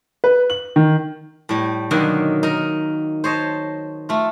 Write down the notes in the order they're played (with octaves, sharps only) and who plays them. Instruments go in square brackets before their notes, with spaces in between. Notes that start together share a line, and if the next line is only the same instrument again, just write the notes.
[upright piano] B4
F#7
D#3
[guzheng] A2 G3
B2 D3 D#3 F#3 A#3
D#4 A#4
C5 C#5 D#5 A5
A3 F4